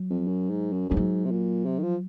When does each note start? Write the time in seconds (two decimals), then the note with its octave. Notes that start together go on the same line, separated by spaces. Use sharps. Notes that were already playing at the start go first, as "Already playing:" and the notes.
Already playing: F#3
0.10 F2
0.27 F#2
0.50 G#2
0.73 F#2
0.90 F#2 F3
0.96 G#2 F#3
1.25 C3
1.31 A#2
1.66 C3
1.79 D#3
1.83 F3